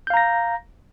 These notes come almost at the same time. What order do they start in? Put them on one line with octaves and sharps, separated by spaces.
G6 F5 A#5 A#6